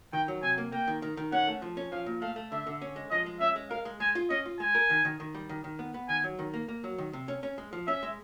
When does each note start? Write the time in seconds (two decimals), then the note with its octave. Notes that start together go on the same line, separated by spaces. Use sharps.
0.13 D#3 G5
0.28 F#3
0.43 C3 G#5
0.58 A#3
0.72 A#3 G5
0.88 D#3
1.02 D#3
1.17 D#3
1.32 C#4 F#5
1.47 A3
1.62 F3
1.77 C#4
1.92 F3 F5
2.06 A#2
2.22 A3 F5
2.36 A3
2.52 D3 E5
2.67 D3
2.82 C#4
2.96 G#3
3.11 F3 D#5
3.26 G#3
3.40 C#4 E5
3.56 G#3
3.70 A#4 F5
3.85 G#3
4.00 G#3 G#5
4.15 F4
4.30 C#4 D#5
4.45 F4
4.60 G#3 G#5
4.75 A#4
4.90 D#3
5.05 D#3
5.20 D#3
5.35 G3
5.49 D#3
5.64 D#3
5.79 B3
5.94 B3
6.09 D#3 G#5
6.24 F#3
6.39 D#3
6.54 A#3
6.68 A#3
6.84 F#3
6.98 D#3
7.13 C3
7.28 C#4
7.43 C#4
7.58 G#3
7.73 F3
7.87 C#4 E5
8.03 G#3